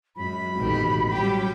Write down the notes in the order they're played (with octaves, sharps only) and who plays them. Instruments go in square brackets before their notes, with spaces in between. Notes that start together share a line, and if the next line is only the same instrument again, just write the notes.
[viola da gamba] F#2 G#3 [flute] B5
[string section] A1 F2 G#2 [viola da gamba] B2 D#3 G4
[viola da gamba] F#3 G3 C#4 [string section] G4